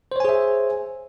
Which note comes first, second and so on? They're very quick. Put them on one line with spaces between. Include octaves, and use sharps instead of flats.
C5 C#5 G#5 G#4 E5